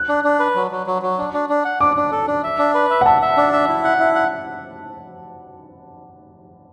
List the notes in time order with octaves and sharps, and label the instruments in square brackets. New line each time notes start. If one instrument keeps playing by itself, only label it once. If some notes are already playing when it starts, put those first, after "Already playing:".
Already playing: [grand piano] F#6
[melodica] D4
D4
B4
F#3
F#3
F#3
F#3
D4
D4
D4
F#5
[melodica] D4 [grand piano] D6
[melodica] D4
A4
D4
E5
D4
B4
E5
[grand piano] F#5
[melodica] E5 [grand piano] A5
[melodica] E5
D4
E5
E4
F#5
E4
F#5